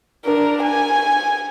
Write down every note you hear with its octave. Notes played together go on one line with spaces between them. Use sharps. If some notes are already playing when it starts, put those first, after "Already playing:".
D4 A#4
G#5